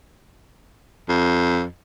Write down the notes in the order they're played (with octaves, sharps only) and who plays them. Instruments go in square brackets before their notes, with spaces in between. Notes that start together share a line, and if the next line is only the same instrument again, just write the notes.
[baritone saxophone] F2